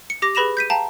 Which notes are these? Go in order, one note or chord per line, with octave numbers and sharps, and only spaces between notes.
C#7
G4 D6 A#6
G#4 B4 B5 A#6 E7 F7
G6 B6 D#7
F5 G5 A5 A#5